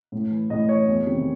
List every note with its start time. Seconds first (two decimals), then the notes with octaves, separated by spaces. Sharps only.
0.12 A2
0.31 E3
0.50 A2 D#5
0.69 E3 C#5
0.88 E2
1.06 C3 D#3